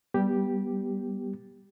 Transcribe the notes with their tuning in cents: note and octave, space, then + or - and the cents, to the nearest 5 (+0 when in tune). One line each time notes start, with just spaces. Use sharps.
G3 -10 B3 -15 G4 +0